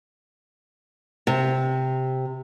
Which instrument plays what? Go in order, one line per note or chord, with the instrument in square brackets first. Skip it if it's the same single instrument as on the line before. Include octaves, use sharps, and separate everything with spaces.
[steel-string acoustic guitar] C3